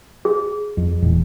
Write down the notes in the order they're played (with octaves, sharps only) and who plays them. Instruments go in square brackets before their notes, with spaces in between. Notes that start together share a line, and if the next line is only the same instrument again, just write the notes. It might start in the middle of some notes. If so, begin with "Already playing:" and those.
[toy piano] G#4
[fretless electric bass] F2
E1 E2 A#2